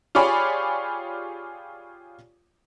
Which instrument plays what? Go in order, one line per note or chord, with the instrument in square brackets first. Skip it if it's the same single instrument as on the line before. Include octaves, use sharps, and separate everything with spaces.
[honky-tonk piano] F4 G4 G#4 C#5 D5 B5